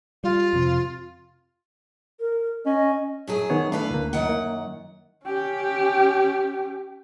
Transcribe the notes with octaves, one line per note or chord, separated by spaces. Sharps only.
G3 F4
F2 C3
A#4
C#4 D#5
F#2 F#3 G#4
D#3 B3 C#5
E2 A3 D4 B4 F5
D2 A#3
F#2 D#3 F#5
A#3
C#4 G4